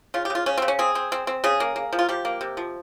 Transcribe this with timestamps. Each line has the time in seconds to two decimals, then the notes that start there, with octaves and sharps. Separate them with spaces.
0.14 C#3 F4
0.25 G4
0.30 C#3
0.35 F4
0.46 C#3 C#4
0.58 C#3 C4
0.68 C#4
0.79 C4 G#4
0.95 C4
1.12 C4
1.27 C4
1.44 C#3 G#4
1.60 A#3
1.76 A#3
1.93 F3
1.99 F4
2.09 F3 G4
2.25 A#3
2.41 C3
2.57 F3